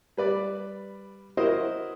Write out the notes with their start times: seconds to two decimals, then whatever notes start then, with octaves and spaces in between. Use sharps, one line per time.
0.17 G3 B4 D5
1.37 E4 F#4 A#4 C5 D#5